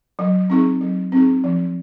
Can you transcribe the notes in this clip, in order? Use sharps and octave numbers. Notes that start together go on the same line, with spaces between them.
F#3
C4 D#4 G#4
F#3
C4 D#4 G#4
F3